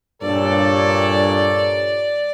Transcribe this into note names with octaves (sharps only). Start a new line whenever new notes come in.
G2 A#2 A4 C#5 D5